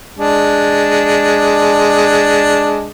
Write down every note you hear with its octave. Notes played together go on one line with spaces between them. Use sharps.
G#3 D4